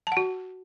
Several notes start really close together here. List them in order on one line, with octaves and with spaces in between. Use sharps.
A5 F#5 F#4